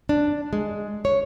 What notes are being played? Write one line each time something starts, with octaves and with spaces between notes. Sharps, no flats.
D4
G#3
C#5